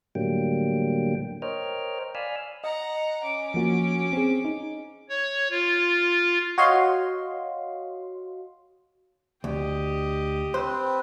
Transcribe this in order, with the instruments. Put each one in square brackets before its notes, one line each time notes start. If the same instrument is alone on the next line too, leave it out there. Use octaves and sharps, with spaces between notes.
[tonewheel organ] A2 D3 F#3 G3 A#3 G5
A#4 C5 C#5 D#5 G5 F6
D5 F5 G#5 B5 E6 F6
[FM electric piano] D#5 [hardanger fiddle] F#5 A#5
[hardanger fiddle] C#4 D6
[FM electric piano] F3 A#3 F#4
C4 G#4
D#4
[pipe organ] C#5
F4
[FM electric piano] F#4 C#5 D#5 F5 C6
[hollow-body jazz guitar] D2 [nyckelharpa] G4 D#5
[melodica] C4 B4 [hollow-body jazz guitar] C5